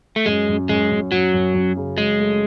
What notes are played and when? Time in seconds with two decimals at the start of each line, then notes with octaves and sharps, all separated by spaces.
0.16 A3
0.26 F#2 G#3
0.48 F#2
0.69 F#2 G#3
0.90 F#2
1.11 F#2 F#3
1.34 F#2
1.54 F#2
1.77 C#3
1.97 F#3 G#3
2.19 A3